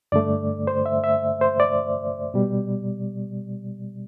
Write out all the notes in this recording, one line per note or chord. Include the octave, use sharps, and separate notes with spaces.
G2 D3 A3 D5
C5
E5
E5
C5
D5
B2 G3